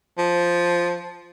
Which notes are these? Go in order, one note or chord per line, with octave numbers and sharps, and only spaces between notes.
F3